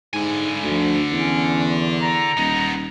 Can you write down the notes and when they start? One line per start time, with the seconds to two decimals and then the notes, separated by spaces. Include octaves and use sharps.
0.14 G#2 D3 G#5
0.63 D2 F3
1.12 E2 C#4
2.01 A#5
2.37 D#1 B3 D#4